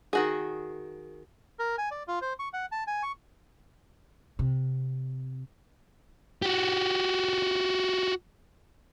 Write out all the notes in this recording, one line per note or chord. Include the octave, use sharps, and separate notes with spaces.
D#3 F#4 G#4
A#4
G#5
D5
F4
C5
C#6
F#5
A5
G#5
C#6
C3
F#4 G4